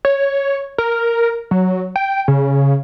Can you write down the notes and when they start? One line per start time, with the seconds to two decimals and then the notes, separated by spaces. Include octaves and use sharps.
0.05 C#5
0.78 A#4
1.51 F#3
1.96 G5
2.28 C#3